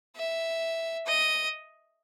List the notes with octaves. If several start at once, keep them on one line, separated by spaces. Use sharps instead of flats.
E5
D#5